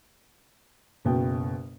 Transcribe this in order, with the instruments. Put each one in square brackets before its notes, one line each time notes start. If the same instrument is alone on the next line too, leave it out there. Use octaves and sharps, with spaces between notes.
[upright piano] F#1 B2 G5